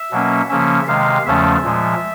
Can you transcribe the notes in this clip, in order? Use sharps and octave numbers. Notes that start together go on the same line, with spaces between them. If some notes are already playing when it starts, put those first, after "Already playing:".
Already playing: E5
B2 F#3 A#3 C#4
C#3 F3 A#3 C#4 E5
C3 D#3 G#3 F5
E2 C#3 F3 A3 C#4 E5
A#2 F3 G#3